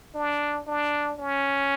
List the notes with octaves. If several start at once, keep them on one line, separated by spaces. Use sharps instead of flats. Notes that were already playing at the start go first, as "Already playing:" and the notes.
D4
D4
C#4